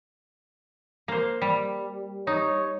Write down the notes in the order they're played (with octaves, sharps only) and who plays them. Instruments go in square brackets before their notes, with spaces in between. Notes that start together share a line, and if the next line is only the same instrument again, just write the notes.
[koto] A#3 C5
G3
[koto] D#4 [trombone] C#5